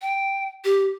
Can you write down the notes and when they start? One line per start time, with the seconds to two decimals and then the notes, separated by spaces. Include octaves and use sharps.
0.02 G5
0.65 G4